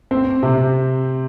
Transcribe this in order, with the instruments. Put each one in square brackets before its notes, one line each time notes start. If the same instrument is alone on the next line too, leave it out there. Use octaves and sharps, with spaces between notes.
[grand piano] C4
C3